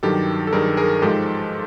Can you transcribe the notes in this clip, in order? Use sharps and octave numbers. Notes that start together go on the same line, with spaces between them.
G2 D#3 F#3 G4 A4
A4
G2 D#3 F#3 G#4 A#4
G#4 A#4
G#2 F3 G#3 G4 A4